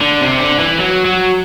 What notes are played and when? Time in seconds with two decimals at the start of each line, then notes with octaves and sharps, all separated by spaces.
0.02 D3
0.22 C3
0.41 D3
0.59 E3
0.80 F#3
1.05 F#3